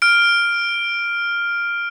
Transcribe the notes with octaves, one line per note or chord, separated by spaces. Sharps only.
F6 D7